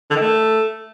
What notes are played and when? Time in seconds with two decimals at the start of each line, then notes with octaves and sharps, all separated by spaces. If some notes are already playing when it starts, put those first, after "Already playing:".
0.11 D3
0.16 D#3
0.21 A3